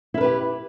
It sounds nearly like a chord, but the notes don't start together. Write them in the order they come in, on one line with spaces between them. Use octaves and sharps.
E4 A#4 B4 G4